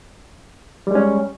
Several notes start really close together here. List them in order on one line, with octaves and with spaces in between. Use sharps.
G3 G#3 C#4